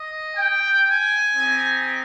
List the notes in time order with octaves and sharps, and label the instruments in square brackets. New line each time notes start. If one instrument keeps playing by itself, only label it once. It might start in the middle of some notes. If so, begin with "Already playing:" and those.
Already playing: [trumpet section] D#5
G5
G#5
C4 D#4 G4